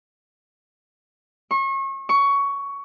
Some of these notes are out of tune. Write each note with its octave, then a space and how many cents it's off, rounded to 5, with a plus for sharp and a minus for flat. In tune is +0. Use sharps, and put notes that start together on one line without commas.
C#6 -35
C#6 +15